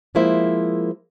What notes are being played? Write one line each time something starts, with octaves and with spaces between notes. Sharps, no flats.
F3 G#3 A#3 E4 C5 E5